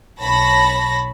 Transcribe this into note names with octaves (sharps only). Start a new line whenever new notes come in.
B1 C#5 A5 B5 A#6